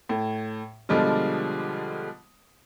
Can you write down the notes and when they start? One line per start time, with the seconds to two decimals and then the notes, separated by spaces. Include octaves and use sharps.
0.09 A2
0.89 B2 D3 F3 G3 G#3 F4